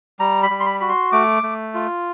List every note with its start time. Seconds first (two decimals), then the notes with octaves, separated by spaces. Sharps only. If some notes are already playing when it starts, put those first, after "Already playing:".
0.19 G3 A#5
0.43 B5
0.50 G3
0.60 C6
0.66 B5
0.80 F#4 B5
0.89 C6
1.12 A3 D6
1.43 A3
1.74 F4